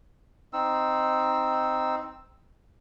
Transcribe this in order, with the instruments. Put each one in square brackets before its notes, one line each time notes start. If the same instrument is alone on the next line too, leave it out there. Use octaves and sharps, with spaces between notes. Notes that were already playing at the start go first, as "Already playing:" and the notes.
[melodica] C4 D#4 E6